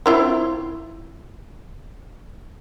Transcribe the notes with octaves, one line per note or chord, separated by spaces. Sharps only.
C4 E4 F4